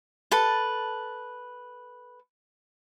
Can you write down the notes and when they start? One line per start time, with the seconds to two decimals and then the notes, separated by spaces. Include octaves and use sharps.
0.31 A4 B4 A5